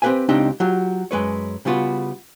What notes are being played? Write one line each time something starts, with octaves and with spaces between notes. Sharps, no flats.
C4 G4 G#4 B4 F5 G#5
C#2 C4 D4 D#4 G4 G5
F#3 F4 G4
F#2 G#3 B4 C#5
C#3 G3 B3 F4 F#4